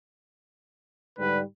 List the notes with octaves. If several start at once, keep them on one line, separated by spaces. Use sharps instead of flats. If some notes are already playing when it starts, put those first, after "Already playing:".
G#2 D3 G3 B4